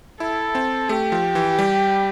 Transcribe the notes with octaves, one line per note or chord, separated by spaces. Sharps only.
E4 A4
C4
A3 G4
F3
E3
G3